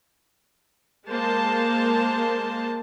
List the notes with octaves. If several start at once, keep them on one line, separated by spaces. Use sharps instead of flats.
G#3 A#3 C5 A5